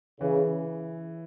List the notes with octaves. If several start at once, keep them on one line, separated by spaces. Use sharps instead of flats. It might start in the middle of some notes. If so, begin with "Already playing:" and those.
C#3 E3